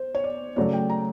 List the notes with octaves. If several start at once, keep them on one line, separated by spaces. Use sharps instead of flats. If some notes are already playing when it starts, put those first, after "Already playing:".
Already playing: C5
C#5
D5
C#3 F#3 A3 D5
G5
A#5